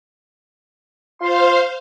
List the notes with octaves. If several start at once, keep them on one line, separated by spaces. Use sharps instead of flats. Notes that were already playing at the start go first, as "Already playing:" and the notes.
F4 C5 F5 C6